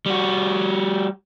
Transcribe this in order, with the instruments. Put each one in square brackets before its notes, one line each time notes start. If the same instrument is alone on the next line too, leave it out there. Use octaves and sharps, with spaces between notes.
[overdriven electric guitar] G3 F#4